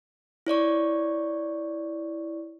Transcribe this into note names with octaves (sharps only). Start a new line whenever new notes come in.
E4 C#5 D5 C#6